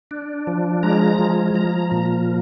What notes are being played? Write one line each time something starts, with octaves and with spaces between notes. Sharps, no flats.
D4
F3
G#3 A#5
F3
F3 A#5
A#2